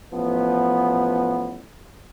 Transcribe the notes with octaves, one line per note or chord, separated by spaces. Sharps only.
A1 F3 B3